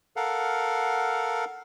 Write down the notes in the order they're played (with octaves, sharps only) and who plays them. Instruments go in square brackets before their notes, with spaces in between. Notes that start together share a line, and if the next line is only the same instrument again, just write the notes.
[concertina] A4 A#4 F5 F#5